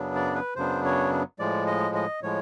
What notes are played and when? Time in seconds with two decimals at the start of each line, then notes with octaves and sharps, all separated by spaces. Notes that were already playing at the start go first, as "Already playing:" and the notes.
Already playing: F#2 C#3 F#3 B3 D4
0.15 D5
0.35 B4
0.56 F#2 C#3 F#3 B3 D4 C5
0.85 C#5
1.39 A2 F3 G#3 D5
1.67 D#5
1.95 D#5
2.22 A2 F3 G#3 C#5